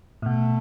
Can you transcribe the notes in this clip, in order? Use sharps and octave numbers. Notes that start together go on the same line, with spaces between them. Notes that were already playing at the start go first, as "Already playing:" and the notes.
A2
B2 A3